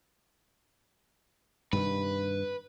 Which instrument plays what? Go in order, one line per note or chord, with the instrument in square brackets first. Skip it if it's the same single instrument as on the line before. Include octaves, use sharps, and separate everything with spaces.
[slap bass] G2 C3 D#3 [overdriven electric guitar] B4